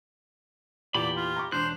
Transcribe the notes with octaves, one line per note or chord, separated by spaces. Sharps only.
E2 A#2 G4 D5 B5
F4
A#5 C#6 D6
E1 D4 C5 F#6